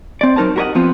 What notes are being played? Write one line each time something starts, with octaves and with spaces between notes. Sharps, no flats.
C4 D5
B1 F#3 D#4 A#4 C5 A5
F#4 G4 A#4 C#5 D#5 F#5
F3 B3 C4 F4